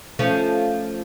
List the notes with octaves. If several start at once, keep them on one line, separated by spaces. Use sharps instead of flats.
F3 A3 C#4